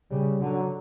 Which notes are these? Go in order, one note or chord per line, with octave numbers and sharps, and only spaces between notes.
C#3 G3
D3 F#3